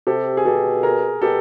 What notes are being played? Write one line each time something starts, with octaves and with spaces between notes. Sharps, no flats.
C3 G4 A4
G#4
B2 G4 A4
G#4 A#4
B2 G4 A4